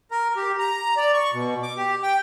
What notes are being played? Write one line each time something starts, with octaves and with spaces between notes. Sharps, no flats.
A#4
G4
A#5
D5
C#6
B2
D6
G4
G5